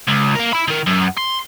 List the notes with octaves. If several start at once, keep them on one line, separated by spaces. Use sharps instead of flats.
C#2
A#3 A#4
E5 B5
D#3 A#4
F#2
C6